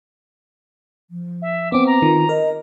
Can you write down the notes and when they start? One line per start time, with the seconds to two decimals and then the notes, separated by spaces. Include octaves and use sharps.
1.10 F3
1.42 E5
1.72 B3 C4 D6
1.86 A#5
2.02 D#3 F4
2.29 A#4 D#5